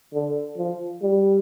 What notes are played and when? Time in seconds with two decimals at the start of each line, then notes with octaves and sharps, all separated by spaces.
0.14 D3
0.57 F3
1.02 G3